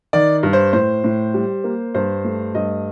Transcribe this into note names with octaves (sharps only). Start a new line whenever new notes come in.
D#3 D5
G2
C5
A2 C5
A2
G3
A#3
G2 C5
A3
G2 D#5